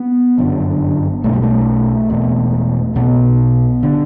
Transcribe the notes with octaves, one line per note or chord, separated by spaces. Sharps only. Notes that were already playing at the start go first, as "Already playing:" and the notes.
Already playing: B3
G1 F#2 D3
B1 B2 A3
G3
A3
E1 E2 B2
B1 B2 B3
D3